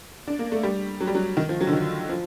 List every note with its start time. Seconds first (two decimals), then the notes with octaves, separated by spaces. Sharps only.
0.27 D4
0.39 A#3
0.52 A3
0.63 G3
1.00 F#3
1.07 G3
1.15 F#3
1.37 D#3
1.49 F3
1.61 F#3
1.67 D3
1.73 D#3
2.09 F3